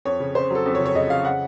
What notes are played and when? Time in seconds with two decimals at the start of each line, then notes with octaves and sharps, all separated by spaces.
0.05 F2 C#5
0.20 C#3
0.35 C#3 C5
0.50 F#3 A4
0.66 F2
0.75 C#5
0.80 C#3
0.86 C#5
0.95 C#3 D#5
1.10 C#3 F5
1.25 F#5